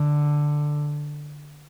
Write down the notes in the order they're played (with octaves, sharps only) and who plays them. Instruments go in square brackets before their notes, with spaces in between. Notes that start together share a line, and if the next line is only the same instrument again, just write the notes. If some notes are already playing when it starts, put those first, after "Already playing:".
Already playing: [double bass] D3